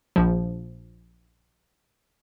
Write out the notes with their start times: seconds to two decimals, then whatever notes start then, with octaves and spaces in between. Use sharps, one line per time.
0.16 A#1 F3